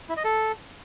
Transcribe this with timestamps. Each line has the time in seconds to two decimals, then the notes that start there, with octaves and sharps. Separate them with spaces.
0.09 E4
0.17 D#5
0.24 A4